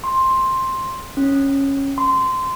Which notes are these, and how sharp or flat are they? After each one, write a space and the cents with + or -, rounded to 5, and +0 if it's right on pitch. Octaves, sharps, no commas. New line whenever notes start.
C6 +5
C#4 -10
C6 -20